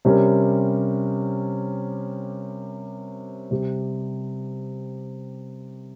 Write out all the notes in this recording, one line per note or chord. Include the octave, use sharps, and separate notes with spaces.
C3 G3 C#4 G4 A#4
C3 G3 C4 G4